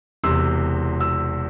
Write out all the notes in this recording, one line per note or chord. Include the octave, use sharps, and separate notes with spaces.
E1 E2 C3 C6 E6
E6